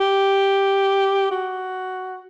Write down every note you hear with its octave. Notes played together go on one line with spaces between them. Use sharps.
G4
F#4